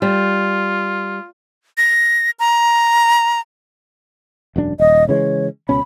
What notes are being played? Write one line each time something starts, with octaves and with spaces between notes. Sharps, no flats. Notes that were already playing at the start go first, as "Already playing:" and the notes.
G3 F4
A#6
A#5
E1 F#2 D4
D#1 D#5
C#3 E3 G#3 C#5
C#2 B2 C#4 B5